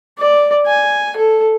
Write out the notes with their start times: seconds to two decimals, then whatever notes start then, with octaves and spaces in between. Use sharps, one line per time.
0.18 D5
0.66 G#5
1.16 A4